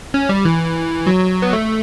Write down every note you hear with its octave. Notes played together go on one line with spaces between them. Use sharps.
C#4
G3
E3
F#3
B3
A3